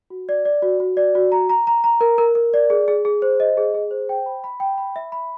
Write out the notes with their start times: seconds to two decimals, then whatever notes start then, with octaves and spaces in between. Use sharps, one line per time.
0.10 F#4
0.29 D5
0.45 D5
0.62 F#4
0.80 F#4
0.97 D5
1.15 F#4
1.32 A#5
1.50 A#5
1.67 A#5
1.84 A#5
2.01 A#4
2.18 A#4
2.35 A#4
2.54 D5
2.70 G#4
2.88 G#4
3.05 G#4
3.22 C5
3.40 D#5
3.57 G#4
3.74 G#4
3.91 C5
4.09 G5
4.26 B5
4.44 B5
4.60 G5
4.78 B5
4.96 E5
5.12 B5